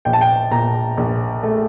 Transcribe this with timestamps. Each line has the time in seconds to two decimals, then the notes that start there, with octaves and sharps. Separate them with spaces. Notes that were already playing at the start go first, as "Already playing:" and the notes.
0.05 A#1 G5
0.13 A5
0.21 G5
0.51 A#2 A#5
0.97 A#1
1.43 A3